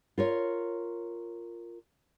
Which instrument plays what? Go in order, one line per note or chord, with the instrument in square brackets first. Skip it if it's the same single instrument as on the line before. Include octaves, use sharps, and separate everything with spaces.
[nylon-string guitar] F4 A#4 C#5